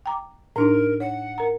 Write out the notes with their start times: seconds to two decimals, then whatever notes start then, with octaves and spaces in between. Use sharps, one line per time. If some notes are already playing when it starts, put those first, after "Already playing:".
0.06 G5 A#5 D6
0.56 A2 D4 D#4 A#4
1.00 C#5 F#5
1.38 A#4 A#5